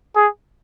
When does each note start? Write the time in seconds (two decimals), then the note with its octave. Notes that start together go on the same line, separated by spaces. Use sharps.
0.16 G#4